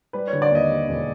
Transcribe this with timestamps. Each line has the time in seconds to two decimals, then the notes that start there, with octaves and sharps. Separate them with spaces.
0.13 G3 B4
0.28 C#5
0.33 D3
0.42 D5
0.51 D#2 D#5
0.70 G3
0.88 E1